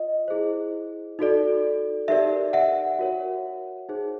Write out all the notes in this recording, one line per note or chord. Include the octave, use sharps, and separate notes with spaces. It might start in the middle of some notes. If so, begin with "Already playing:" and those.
Already playing: F4 D#5
E4 G#4 C5
D#4 F#4 A4 D5
D#4 G4 A#4 D5 E5
E5 F#5
F#4 A#4 C#5
D#4 G#4 C5